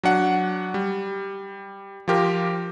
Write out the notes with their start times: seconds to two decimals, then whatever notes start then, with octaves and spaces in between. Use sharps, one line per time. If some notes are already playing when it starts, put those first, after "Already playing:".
0.03 F#3 D4 F#5
0.74 G3
2.08 F3 F4 G4 A#4